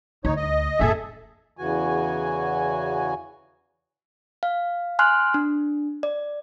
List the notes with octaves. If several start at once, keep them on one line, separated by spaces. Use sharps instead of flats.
D2 D#4 C#5
D#5
F1 A#2 G#4 A4 E5
E2 C#3 E3 F#4 G#5
F5
G#5 C6 F6 F#6
D4
D5